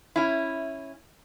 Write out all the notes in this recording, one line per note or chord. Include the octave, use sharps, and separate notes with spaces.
C#4 E4